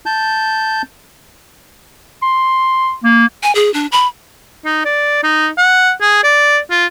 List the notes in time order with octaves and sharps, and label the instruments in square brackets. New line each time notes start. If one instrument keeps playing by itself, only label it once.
[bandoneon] A5 G6
[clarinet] C6
A#3
[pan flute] G#5
G#4
D4
B5
[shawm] D#4
D5
D#4
F#5
G#4
D5
F4